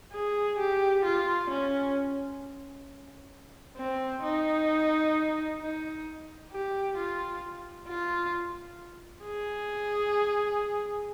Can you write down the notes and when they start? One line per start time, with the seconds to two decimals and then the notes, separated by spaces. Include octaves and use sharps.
0.12 G#4
0.58 G4
1.05 F4
1.50 C#4
3.77 C4
4.23 D#4
5.61 D#4
6.51 G4
6.97 F4
7.88 F4
9.25 G#4